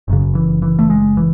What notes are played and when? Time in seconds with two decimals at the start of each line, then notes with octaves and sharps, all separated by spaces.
0.08 F#1 F#2 C#3
0.35 E3
0.62 E3
0.79 A3
0.90 G#3
1.17 E3